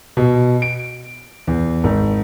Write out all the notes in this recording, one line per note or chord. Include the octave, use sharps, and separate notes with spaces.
B2
D7
E2
G#1